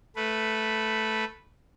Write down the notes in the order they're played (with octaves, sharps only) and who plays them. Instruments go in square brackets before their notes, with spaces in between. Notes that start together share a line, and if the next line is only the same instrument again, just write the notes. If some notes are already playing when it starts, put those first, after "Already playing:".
[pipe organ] A3 B4